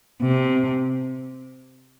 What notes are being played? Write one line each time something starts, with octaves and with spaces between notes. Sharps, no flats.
C3